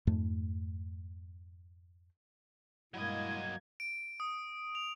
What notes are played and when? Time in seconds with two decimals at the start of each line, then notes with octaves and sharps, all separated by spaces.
0.07 F2 G#2 A3
2.94 G2 F#3 G#3 A#3 E4 D#5 G#6
3.80 D7
4.20 D#6
4.75 F7